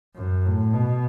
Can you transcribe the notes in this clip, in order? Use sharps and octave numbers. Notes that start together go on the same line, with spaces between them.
F#2
A2
B2